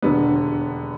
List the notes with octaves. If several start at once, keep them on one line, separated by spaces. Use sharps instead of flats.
E1 D#2 D3 G3 B3